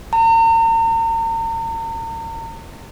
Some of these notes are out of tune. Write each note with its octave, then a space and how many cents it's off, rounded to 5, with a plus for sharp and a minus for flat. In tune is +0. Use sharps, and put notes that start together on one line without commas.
A#5 -40